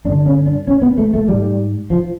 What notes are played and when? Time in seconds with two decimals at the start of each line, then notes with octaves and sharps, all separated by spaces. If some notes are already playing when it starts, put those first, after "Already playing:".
0.05 G2 D4
0.09 D3
0.26 C#4
0.46 D4
0.67 C#4
0.82 B3
0.98 A3
1.14 A3
1.28 G#2 G3
1.90 F3